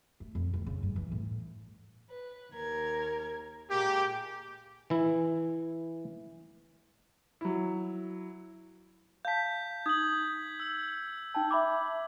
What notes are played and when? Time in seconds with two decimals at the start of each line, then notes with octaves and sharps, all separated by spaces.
0.20 A3
0.35 F2
0.54 D2
0.67 C#3
0.83 G2
0.96 E3
1.12 A2
2.09 B4
2.51 D#2 A#4 G#6
3.69 A#2 G#3 A#3 G4
4.90 E3 E4
7.41 F#3 E4
9.25 F5 A5 G6 B6
9.86 D#4 D#6 G#6 F#7
10.60 E6
11.34 D#4 G5 A5
11.51 E5 B5 D6